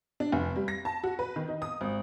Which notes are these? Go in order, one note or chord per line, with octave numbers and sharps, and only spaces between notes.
D4
F1
G3
A#6
A5
F#4
B4
D#3
D#4
D#6
G#1